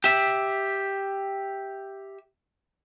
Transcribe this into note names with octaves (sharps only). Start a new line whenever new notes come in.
G4 E5